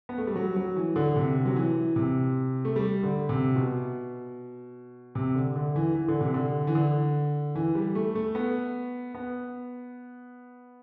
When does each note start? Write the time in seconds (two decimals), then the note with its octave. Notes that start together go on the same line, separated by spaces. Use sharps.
0.09 B3
0.18 A3
0.27 G3
0.36 F#3
0.56 F#3
0.76 E3
0.96 D3
1.16 C3
1.45 F#3
1.56 E3
1.96 C3
2.65 A3
2.76 G3
3.03 D3
3.29 C3
3.56 B2
5.15 C3
5.35 D3
5.56 D3
5.76 E3
5.95 E3
6.08 D3
6.21 C3
6.34 D3
6.67 E3
6.75 D3
7.55 E3
7.75 G3
7.95 A3
8.15 A3
8.35 B3
9.14 B3